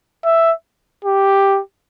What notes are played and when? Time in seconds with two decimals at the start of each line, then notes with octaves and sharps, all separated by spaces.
0.24 E5
1.05 G4